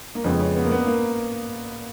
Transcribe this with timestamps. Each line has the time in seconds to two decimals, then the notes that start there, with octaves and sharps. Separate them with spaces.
0.15 A#3
0.24 F2 C#3 G#3 B3
0.40 C#4
0.56 B3
0.64 A#3
0.71 B3
0.87 A#3